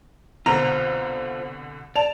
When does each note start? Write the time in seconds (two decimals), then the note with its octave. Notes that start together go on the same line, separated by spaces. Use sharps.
0.46 C2 B2 D3 F4 C5 A#5
1.96 D5 A5 F7